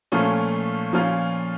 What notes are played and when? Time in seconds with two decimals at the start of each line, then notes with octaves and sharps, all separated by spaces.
0.12 A#2 F3 A3 C#4 F4
0.93 A#2 F3 C#4 F4